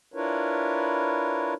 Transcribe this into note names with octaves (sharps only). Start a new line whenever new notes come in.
D4 E4 F4 A#4 B4 C#5